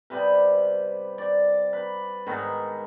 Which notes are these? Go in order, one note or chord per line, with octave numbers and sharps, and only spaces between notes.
C3 G3 B3 B4
D5
B4
G#2 D#3 B3